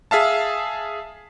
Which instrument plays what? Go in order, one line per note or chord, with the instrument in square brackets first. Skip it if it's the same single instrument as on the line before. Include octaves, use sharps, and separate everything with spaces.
[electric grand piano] G#4 E5 F5 A5